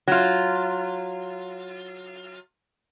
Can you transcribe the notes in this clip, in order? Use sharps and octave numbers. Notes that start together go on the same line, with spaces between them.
F#3 F4